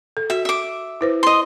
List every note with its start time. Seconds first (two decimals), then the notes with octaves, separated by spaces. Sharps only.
0.17 A4
0.30 F#4 E5
0.45 E5 D6
1.01 E4 B4 C5
1.23 D#5 C6